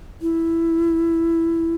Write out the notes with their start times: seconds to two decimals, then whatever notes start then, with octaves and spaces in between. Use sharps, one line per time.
0.22 E4